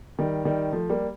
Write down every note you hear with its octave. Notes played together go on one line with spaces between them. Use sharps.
D#3 G3
D#3 G3
F3 A3
G3 A#3